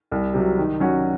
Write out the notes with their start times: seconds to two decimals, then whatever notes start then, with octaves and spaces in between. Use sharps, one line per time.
0.11 C2
0.34 C3 F#3
0.58 D#3
0.80 F#3 C#4 F#4